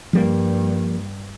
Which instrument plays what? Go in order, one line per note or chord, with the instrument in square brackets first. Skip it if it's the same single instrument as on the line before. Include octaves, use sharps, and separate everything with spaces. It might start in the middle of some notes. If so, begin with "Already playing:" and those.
[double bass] G2 [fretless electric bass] F3 G3 A#3